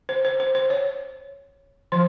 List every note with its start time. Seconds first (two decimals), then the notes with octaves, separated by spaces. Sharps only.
0.09 C5
0.25 C5
0.40 C5
0.55 C5
0.70 C#5
1.92 F3 C5